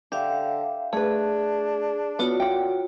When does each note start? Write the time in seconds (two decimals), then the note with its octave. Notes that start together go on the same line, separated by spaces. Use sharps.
0.12 D3 G4 E5 F5
0.93 A3 D4 G#4 B4
2.19 B3 F4 F#4 C#5
2.40 A#2 F#5 G5